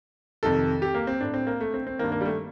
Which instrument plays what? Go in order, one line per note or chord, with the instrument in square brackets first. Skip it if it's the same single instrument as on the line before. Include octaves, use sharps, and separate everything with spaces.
[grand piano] F2 C3 D#3 A4
G4
A#3
C4
A2 D4
C4
A#3
A3
C4
C4
G2 D#3 A#3
A#3
G3
A3